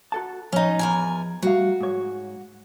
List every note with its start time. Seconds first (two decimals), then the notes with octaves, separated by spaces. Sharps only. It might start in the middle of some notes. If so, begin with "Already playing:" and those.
0.12 F#4 A4 A5
0.52 F3 C#4 D#4
0.79 E2 A#4 G#5
1.42 G3 A3 F#4 F5
1.81 G#2 C#5